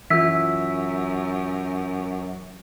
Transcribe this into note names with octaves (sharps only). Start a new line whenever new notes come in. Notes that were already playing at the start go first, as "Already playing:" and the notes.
F#2 E3 F4 E5 E6 B6